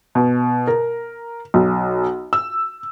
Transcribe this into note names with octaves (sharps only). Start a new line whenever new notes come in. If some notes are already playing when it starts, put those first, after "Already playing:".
B2
A#4
B1
E6